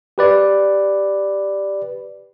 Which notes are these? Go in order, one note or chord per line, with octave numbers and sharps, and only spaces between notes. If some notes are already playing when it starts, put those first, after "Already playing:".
G4 B4 D5